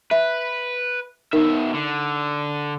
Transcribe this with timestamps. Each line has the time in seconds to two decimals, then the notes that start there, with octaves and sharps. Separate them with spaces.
0.11 B4 E5
1.33 B2 D#4 A#4 E5
1.74 D3